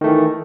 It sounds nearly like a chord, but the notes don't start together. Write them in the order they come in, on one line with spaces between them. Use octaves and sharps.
D#3 A3 E3